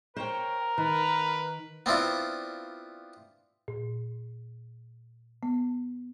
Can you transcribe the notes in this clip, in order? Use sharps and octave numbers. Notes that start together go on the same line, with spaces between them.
A#4 C5 C#5 G5
D#3 B4
B3 C4 D4 E4 F4
A#2
B3